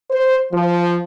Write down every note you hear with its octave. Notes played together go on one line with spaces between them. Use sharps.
C5
F3